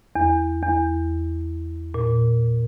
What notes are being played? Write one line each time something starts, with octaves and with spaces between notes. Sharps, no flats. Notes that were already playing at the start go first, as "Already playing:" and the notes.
E2
E2
A#2